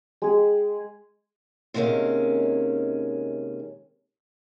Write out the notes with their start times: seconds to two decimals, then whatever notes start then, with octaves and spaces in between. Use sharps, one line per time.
0.22 G#3 G#4
1.74 C3 D#3 G#3 A#3 C#4